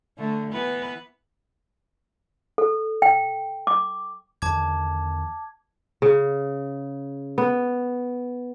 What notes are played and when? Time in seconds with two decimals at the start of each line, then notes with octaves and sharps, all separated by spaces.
0.18 D3 A3
0.52 E3 B3 B4
2.58 A4
3.02 G5
3.67 D6
4.42 E2 D3 D#3 A5 D6 G#6
6.02 C#3
7.38 B3